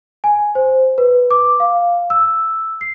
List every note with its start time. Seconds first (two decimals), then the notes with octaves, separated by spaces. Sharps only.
0.24 G#5
0.55 C5
0.98 B4
1.31 D6
1.60 F5
2.10 E6
2.81 C7